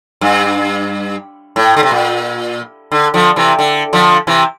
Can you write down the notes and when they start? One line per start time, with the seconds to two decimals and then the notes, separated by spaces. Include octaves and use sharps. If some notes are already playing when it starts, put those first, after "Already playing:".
0.21 G2
1.56 A2
1.77 D3
1.83 C3
1.91 A#2
2.92 D3
3.14 D3 F3
3.36 C3 E3
3.59 D3
3.93 D3 F3
4.27 C3 E3